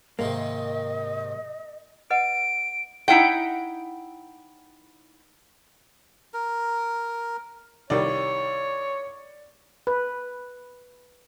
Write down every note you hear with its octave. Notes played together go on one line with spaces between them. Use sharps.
G#2 C3 D#3 A#3 D#5
B4 D#5 F#5 D7
D#4 E4 F#5 G5
A#4
C2 D#3 G3 C#5 D5
B4